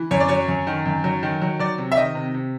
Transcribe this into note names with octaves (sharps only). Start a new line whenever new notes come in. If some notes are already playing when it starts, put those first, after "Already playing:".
Already playing: E3
F#2 C#5
D5
F#3 C#5
F#2
D#3
F#2
F#3
D#3
F#3
F#3 D5
C3
E5
D#3 D#5
C3
C3